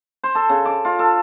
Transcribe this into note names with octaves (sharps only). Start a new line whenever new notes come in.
C5
A4
C#3
D6
F4
A4